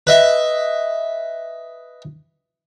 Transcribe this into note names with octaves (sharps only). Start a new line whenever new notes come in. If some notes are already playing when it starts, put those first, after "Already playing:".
B4 D#5 E5